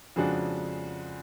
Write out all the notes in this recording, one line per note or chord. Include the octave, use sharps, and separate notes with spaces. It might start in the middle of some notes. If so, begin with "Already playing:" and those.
F2 C#3 G#3 D4 F#4